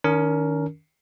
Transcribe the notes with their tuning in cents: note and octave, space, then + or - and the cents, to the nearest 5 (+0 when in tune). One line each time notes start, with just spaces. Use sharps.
D#3 +0 C#4 +40 A#4 +0